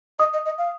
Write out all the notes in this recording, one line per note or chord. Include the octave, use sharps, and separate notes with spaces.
D#5 D#6
D#5
D#5
F5